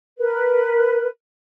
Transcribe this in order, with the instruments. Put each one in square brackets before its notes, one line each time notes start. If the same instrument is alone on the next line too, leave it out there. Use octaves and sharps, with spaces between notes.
[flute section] A#4 B4